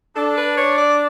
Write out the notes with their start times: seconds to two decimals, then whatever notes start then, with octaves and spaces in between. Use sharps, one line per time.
0.16 D4 A4
0.37 B4
0.57 C#5
0.78 D5